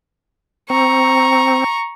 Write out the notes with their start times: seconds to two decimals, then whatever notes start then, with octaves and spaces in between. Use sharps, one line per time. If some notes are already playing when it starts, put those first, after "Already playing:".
0.70 C4 A#5 C#6